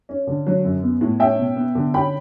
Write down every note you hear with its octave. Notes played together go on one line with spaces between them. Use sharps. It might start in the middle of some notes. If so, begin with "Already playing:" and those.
C#4
D3
F#3
F#2
B3
A2
C#4 E5 G5
B2
B3
D3
C#4 G5 B5